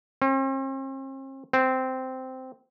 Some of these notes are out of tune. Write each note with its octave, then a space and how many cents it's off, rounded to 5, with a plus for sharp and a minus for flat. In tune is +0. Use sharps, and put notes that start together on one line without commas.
C4 +45
C4 -10